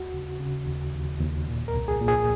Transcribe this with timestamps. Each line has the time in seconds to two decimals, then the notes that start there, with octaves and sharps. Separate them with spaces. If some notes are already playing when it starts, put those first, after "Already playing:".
Already playing: D#2 F#4
0.14 C#3
0.40 C#3
0.67 D#2
0.94 D#2
1.21 D#2
1.48 A#2
1.68 A#4
1.74 C2
1.88 G#4
2.02 A#2
2.08 G#4